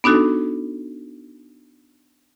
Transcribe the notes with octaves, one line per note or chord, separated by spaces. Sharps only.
B3 D4 D#4 F#4 A4